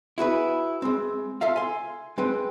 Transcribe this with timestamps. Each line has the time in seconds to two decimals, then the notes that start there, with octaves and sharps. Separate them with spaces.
0.18 E4 F#4 G#4 B4
0.82 G#3 C4
1.41 F4 A4 E5 F5
1.56 G#5 C6
2.18 G#3 C4 B4 G5